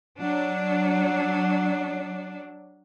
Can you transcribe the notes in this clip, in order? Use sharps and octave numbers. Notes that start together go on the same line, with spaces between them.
F#3 D4